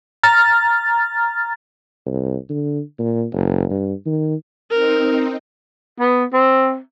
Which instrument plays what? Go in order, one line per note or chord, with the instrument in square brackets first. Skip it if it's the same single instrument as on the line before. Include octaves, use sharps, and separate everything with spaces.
[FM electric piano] A#5 F6 A6
[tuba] C2
D3
A#2
F#1
G2
D#3
[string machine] C4 D#4 [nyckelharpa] A#4
[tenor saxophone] B3
C4